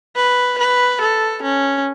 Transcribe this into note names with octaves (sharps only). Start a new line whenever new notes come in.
B4
B4
A4
C#4